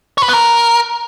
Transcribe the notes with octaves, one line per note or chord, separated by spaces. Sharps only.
C#5
B4
B3
A#4